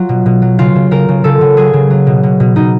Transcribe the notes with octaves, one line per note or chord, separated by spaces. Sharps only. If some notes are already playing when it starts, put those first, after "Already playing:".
Already playing: F#3 F4
B2
B2
F#3
C#3 F4
C#3
C#3 A#4
C#3
C#3 A4
C#3
F#3 G#4
C#3
F#3
B2
B2
B2
B2 D#4